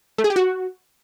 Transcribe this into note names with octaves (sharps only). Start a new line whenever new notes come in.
A3
G#4
G4
F#4